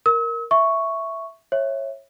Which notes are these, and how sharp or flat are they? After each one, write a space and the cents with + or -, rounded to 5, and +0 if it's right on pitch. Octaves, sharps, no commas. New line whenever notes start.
A#4 +0 E6 -45
E5 +0 C#6 +0
C#5 -20 E5 +0